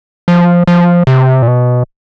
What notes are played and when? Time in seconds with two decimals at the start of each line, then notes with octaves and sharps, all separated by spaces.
0.28 F3
0.67 F3
1.07 C3
1.42 A#2
1.47 B2